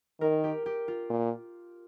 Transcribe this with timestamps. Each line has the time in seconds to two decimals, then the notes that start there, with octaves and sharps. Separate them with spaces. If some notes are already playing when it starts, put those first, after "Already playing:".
0.21 D#3 A#4
0.44 G4
0.66 G4
0.88 F4
1.10 A#2